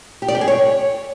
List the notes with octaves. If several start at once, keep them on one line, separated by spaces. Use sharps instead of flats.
G4
D5
G4
G#4
C#5